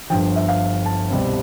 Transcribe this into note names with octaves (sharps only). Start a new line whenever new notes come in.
G1 G2 F3 G5
E5
F5
A5
C2 B2 G3 C4